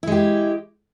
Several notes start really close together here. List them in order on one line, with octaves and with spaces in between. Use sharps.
E4 G#3 G4